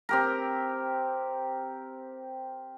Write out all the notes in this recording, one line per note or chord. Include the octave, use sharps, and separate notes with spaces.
C4 G4 A#4